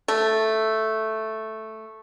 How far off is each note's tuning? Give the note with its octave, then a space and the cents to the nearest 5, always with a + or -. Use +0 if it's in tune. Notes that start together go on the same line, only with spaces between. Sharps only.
A3 +0